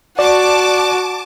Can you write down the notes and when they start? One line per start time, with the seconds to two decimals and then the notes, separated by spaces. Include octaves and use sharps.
0.19 F#4 D5 A5 D6